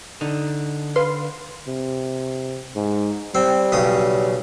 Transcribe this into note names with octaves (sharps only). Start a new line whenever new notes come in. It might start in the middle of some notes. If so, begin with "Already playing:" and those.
D3 D#4
B4 F5 C6
C3
G#2
G3 C4
B1 C#3 D#6